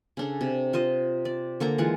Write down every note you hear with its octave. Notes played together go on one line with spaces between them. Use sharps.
C#3 D4 A4
C3
F4 C5 D#5
D5
D3 A#3 A4 A#5
E3 G#3 F4 F#5